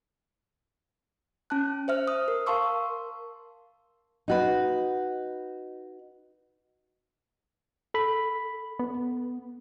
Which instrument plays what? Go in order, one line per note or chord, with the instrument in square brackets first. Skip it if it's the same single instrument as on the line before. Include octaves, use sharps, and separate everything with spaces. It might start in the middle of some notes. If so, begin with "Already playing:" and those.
[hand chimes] C#4 A5 F#6
C5 E5 F6
D#6
A#4
A#4 F5 A5 C6 C#6 E6
[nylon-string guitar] D#4 F#4 B4
[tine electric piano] A4 B5
[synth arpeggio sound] B3